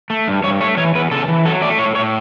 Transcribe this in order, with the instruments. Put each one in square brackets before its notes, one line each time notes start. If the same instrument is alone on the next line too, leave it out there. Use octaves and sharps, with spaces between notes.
[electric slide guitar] A3
G2
G2 C#5
A3 C#5
E3 C#5
E2 B4
C#3 A4
E3
F#3 A4
A3 D5
A2 C#5
A2 C#5